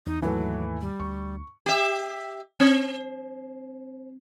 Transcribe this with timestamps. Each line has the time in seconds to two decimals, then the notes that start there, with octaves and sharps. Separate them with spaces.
0.06 E2 D#4
0.22 D#2 G#2 D#3 E3 F#3 A3
0.81 G3
1.00 D2 C#6
1.66 G4 E5
2.60 C4